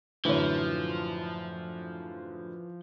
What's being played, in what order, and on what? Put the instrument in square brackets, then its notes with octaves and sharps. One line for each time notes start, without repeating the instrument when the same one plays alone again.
[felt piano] F#2 A2 D3 [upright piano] E3 C#5 [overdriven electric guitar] F3